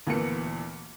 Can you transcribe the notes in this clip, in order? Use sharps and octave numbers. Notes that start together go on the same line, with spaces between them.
D2 A#2 E3 A#3 B3 C#7